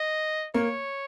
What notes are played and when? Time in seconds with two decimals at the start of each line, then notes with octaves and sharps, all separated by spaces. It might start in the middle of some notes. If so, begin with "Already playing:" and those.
Already playing: D#5
0.54 A#3 C#5